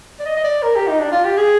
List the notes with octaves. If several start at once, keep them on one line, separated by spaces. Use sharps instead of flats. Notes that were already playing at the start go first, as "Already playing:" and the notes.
D5
D#5
D#5
D5
A#4
G4
D#4
D4
F4
G4
G#4